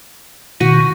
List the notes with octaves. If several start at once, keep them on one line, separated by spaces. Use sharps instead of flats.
B2 D#3 F#4